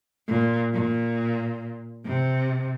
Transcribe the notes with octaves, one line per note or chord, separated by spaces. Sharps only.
A#2
A#2
C3